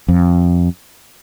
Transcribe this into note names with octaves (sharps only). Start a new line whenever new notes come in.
F2